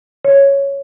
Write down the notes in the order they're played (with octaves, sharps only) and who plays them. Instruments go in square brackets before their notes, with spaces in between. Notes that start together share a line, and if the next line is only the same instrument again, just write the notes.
[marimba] C#5